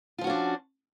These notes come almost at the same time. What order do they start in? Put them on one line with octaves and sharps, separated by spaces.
F4 F3 F#4 C#4 D4